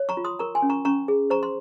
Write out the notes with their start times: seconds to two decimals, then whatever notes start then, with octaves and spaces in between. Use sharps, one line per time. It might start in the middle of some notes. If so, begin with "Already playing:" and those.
Already playing: C#5
0.09 A#5 C#6
0.17 F4
0.25 C6 D#6
0.39 A#4 A#5 C#6
0.55 G#5 C6
0.62 C#4
0.70 A#5 C#6
0.85 C#4 A#5 C#6
1.08 G#4
1.30 C5 A#5 C#6
1.43 C6